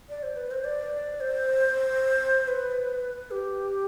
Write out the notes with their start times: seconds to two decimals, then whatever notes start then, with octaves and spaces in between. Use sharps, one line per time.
0.09 D5
0.23 C5
0.36 B4
0.51 C5
0.64 D5
1.20 C5
2.48 B4
3.31 G4